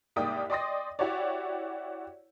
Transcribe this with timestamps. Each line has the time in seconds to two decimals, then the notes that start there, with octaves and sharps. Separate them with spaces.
0.16 C2 G#2 A#3 D5 G5 D#6
0.50 D5 D#5 G5 C6 D#6 A#6
0.99 E4 F#4 G4 C#5 D5